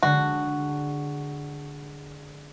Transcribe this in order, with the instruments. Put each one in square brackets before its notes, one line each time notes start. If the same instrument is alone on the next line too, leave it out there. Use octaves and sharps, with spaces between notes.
[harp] D3 G#3 [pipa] F#4